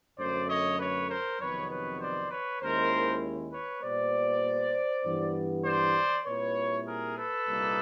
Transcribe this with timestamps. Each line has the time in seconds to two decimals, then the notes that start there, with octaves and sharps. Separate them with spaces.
0.18 F#2 D3 F#3 A3 C5 D5
0.49 C#5 D#5
0.79 B4 C#5
1.09 A#4 C5
1.40 F2 C3 D#3 F#3 B3 B4 C#5
1.70 B4 C#5
2.00 C5 D5
2.30 B4 C#5
2.61 D#2 D#3 G#3 C#4 E4 A#4 C5
3.52 B4 C#5
3.83 A#2 G3 B3 C5 D5
5.04 G2 E3 G3 B3
5.65 C5 D5
6.26 A#2 G3 C4 E4 B4 C#5
6.86 G#4 A#4
7.17 A4 B4
7.47 C2 A#2 G3 A#3 D#4